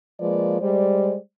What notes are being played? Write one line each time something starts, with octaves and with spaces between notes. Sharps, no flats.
F3 G#3 A#3 B4 D5
G3 G#3 C5 D5